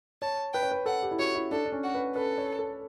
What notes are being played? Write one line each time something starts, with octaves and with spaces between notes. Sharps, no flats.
C#5 A5
B4 G5
C#5
B4
A4 F#5
G4
E4
F#4 C#5
E4
D4 A4
D4
C#4
F#4
B4
A4 B4
C#5
A4